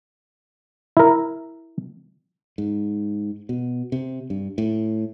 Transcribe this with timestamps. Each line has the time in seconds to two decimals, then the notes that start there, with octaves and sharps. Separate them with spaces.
0.97 E4 A#4
2.58 G#2
3.49 B2
3.92 C3
4.30 G2
4.58 A2